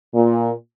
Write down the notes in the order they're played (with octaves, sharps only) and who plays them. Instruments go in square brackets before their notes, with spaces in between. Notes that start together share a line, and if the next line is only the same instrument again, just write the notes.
[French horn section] A#2